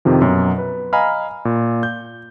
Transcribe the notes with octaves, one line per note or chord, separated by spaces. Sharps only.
F2 C3 D#3 F3
F#2 B2 F#3
B4
D#5 F5 G#5 A#5 B5 F6
A#2
G6